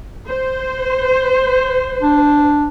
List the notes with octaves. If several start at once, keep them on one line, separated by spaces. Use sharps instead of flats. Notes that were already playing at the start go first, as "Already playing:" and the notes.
C5
D4